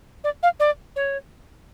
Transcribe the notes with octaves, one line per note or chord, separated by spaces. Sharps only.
D5
F5
D5
C#5